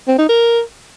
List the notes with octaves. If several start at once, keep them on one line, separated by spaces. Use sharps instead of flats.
C4
D#4
A#4